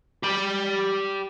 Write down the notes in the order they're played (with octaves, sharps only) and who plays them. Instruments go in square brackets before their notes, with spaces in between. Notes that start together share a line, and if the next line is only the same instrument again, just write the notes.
[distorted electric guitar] G4 B5